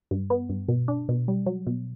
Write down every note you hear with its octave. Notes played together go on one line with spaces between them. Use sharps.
G2
B3
G2
B2
D4
B2
G3
F#3
B2